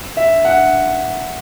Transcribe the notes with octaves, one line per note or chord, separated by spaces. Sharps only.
E5
F#5